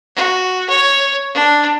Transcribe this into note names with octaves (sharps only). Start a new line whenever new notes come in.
F#4
C#5
D4